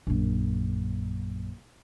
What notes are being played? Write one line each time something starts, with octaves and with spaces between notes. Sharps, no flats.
A#1 F#2